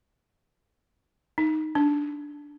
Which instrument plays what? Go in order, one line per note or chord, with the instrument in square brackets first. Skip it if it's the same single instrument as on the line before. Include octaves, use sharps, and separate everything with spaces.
[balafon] D#4
D4